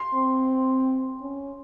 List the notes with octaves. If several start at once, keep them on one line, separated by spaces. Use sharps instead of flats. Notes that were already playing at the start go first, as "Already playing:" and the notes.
Already playing: C6
C4
C#4